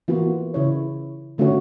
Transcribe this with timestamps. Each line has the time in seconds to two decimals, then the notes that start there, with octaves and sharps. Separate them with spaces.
0.08 E3 A#3 B3 F4 F#4
0.54 C#3 E4 C#5
1.38 D3 A3 C#4 F#4 C#5